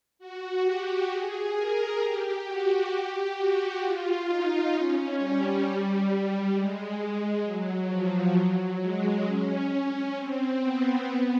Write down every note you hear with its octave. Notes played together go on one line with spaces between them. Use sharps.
F#4
G4
G#4
A#4
G4
F#4
G4
F#4
F4
D#4
C#4
G3
G#3
G#3
F#3
F3
F#3
G#3
C#4
C#4
C4
B3
B3